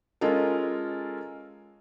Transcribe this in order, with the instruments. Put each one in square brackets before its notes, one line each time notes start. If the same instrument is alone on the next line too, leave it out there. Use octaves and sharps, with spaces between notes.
[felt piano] G#3 C#4 F4 A4 A#4